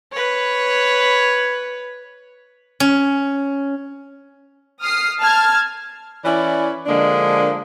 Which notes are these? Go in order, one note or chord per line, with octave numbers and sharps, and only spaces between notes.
B4 C#5
C#4
D#6 F6 C7
A5 F6 G#6
E3 C#4 E4 D5
D3 F3 G#3 A#3 D4